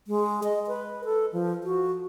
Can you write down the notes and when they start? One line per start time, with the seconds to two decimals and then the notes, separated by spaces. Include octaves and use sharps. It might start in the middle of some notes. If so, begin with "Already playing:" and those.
0.07 G#3
0.44 D#5
0.67 B4
1.04 A4
1.33 F3
1.64 F#4